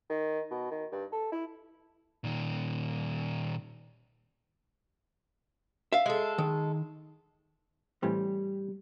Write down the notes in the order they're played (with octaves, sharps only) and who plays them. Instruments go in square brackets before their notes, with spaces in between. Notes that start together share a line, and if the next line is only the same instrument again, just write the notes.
[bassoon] D#3
B2
D#3
G2
A4
E4
[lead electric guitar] A#2 D#3
[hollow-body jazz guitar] E5 F5
[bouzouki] G#3 A4
[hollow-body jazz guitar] D#3
[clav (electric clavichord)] A2 E3 C4 [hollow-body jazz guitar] G3